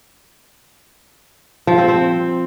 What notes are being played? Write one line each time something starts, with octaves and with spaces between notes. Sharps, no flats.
F3
C4
C4